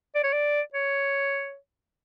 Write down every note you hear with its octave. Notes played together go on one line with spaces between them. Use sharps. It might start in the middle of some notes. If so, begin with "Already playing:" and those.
D5
C#5
D5
C#5